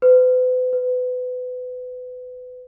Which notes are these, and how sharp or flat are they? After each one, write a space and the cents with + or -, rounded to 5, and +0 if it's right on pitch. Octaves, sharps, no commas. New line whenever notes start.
B4 +40
B4 +30